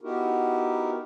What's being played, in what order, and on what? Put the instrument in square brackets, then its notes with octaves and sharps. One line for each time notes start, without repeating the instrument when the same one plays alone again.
[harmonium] B3 D#4 E4 F#4 G4 A#4